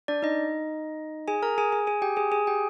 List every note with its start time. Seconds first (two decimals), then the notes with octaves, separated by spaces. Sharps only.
0.08 D4 D5
0.23 D#4 D#5
1.28 G#4 G#5
1.42 A#4 A#5
1.58 G#4 G#5
1.72 G#4 G#5
1.87 G#4 G#5
2.02 G4 G5
2.17 G#4 G#5
2.32 G#4 G#5
2.47 G4 G5